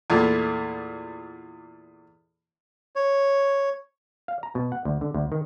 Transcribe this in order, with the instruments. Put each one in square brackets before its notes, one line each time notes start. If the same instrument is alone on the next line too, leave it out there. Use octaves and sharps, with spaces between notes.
[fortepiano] E2 A#2 A3
[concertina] C#5
[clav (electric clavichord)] F5
A#5
B2
F#5
D2
D3
D2
D#3